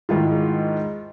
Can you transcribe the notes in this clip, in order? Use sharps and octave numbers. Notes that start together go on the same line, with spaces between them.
G#2 D#3 E4 F4